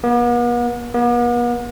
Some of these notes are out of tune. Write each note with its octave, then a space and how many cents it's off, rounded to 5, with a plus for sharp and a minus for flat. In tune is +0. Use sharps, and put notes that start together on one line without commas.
B3 -45
B3 -45